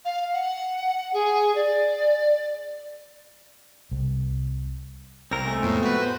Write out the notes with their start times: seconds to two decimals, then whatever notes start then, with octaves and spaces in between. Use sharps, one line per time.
0.05 F5
0.33 F#5
1.13 G#4
1.55 D5
3.91 C2
5.31 C2 C4 A#4 A#6
5.45 G#3 A3 C4 G#5
5.62 F2 A2 B3
5.83 F#4 B4
6.02 C5